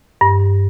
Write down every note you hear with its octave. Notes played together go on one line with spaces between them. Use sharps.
G2